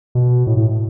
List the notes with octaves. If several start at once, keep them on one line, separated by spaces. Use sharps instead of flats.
B2
A2
A2